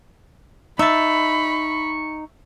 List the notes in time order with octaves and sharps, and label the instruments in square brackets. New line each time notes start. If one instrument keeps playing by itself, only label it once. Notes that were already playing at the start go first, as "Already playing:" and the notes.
[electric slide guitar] D#4 [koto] E5 A5 [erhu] B5 [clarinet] C#6